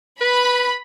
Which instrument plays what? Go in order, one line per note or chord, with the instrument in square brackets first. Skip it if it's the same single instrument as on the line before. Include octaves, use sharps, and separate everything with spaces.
[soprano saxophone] B4 [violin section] B5